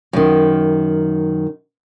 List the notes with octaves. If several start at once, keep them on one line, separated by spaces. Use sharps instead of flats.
F#2 D#3